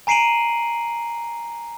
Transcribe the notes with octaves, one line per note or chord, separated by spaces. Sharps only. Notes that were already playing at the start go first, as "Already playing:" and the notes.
G#5 A#5 C7 D7 D#7 F#7